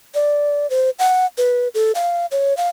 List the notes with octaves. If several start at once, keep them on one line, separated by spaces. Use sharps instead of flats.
D5
C5
F#5
B4
A4
F5
C#5
F5